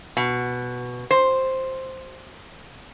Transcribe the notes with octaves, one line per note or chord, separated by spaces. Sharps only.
B2
C5